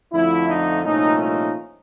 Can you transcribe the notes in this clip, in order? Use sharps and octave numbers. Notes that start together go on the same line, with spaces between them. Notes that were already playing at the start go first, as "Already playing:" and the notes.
F2 D3 F3 A3 E4
D#4
C2 A#2 F3 A3 C#4 D#4
D#4